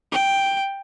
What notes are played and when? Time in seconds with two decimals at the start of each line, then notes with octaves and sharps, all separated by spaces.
0.12 G5